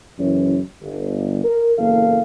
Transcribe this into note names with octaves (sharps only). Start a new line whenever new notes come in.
F#1 F#2 E3 C#4 C#5
G1
A#4
F#1 E2 A#3 A4 F5